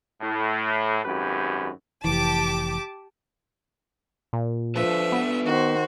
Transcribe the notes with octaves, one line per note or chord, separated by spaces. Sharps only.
A2
G#1 F#2 G4 B4
F1 E3 G4 A5 D6
A#2
F3 D4 A4 B4 E5
B3
D#3 F#4 C5